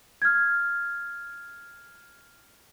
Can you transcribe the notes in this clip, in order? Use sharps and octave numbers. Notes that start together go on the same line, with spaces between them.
F6 G#6